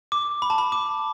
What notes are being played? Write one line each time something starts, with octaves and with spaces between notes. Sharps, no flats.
D6
B5
A5
B5
D6